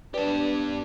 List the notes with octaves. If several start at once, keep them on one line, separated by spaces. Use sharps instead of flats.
B3 D4 G4 B4 D5 A5